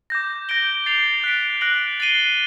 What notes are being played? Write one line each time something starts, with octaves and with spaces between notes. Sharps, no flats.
D6 G6 A#6
G6 A#6 D7 G7
A6 C7 F7
F#6 B6 D7
F#6 A#6 D7 F#7
A6 C7 D#7 G7